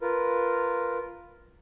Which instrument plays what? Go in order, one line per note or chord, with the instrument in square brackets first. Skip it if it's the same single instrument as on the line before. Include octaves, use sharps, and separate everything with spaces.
[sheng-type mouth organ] F4 A#4 B4